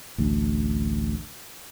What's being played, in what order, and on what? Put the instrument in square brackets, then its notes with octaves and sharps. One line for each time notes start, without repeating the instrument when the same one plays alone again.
[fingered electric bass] A1 D2